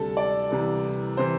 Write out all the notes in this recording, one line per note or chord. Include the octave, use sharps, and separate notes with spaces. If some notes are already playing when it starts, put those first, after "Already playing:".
Already playing: D2 C3 G3 A4
D5
C2 C3 E3 G3
C3 E3 C5